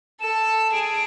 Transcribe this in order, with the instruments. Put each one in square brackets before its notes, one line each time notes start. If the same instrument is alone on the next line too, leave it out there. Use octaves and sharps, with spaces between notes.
[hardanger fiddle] A4 [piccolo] E7
[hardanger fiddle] G#4 [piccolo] D7